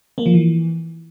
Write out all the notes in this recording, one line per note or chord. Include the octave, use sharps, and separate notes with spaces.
A#3
F3
E3